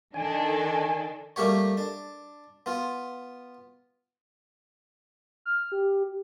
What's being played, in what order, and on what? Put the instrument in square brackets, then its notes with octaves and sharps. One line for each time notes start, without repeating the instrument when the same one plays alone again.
[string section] D#3 D4 A4 [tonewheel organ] G#5
[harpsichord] G3 A3 A#3 G4 C#5
D4
B3 F4
[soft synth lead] F6
G4